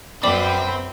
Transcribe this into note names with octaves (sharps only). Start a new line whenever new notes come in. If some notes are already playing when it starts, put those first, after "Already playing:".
F#2 C4 B4 D5 G5 B5 D6 F#7